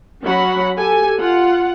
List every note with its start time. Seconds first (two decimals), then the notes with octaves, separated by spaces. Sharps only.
0.24 F#3 C#4 F#4 F#5 B5
0.75 G4 A4 G#5
1.19 F4 F#5